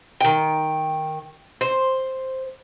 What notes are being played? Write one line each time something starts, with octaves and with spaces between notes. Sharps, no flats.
D#3 G5
C5